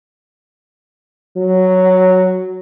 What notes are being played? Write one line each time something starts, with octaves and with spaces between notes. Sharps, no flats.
F#3